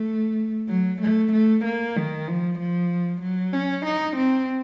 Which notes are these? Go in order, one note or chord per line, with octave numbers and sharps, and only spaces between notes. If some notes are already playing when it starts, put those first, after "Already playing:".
Already playing: A3
F#3
A3
A3
A#3
D#3
F3
F3
F#3
C#4
D#4
C4